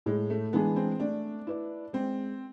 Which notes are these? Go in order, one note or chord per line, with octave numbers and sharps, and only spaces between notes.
A2 G#3
A3
E3 G#3 B3 D4 G#4
C4
A3 D4
E4 B4 D5
G#3 C4